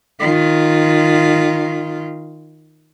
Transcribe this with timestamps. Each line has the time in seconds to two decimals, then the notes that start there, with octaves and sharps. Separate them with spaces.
0.20 D#3 F4